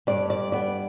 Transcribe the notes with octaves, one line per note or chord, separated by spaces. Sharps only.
G2 D5
D5
B3 D5